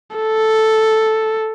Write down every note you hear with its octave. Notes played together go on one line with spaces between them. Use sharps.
A4